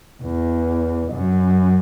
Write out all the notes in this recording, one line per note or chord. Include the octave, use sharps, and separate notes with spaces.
E2
F#2